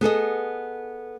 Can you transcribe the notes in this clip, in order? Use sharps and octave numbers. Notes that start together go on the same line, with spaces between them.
B3 G#4 A4 D#5